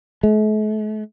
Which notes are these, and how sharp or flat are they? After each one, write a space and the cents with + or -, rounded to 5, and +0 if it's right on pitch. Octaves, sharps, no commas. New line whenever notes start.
A3 -45